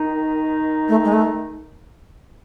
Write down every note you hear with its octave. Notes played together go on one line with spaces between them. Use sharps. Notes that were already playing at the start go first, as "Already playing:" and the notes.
Already playing: D#3 D#4
A3
G#3
A3